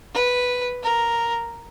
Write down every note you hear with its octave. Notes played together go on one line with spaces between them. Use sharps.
B4
A#4